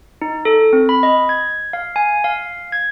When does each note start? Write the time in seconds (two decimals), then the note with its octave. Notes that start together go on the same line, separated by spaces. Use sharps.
0.22 D#4
0.45 A4
0.73 C4
0.89 B5
1.03 D#5
1.29 G#6
1.73 F5
1.96 G#5
2.24 F5
2.72 G#6